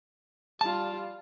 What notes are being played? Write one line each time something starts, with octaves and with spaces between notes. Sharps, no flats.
G3 F4 A5